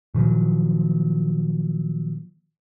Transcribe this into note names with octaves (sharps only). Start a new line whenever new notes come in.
A#2 D#3 F3 F#3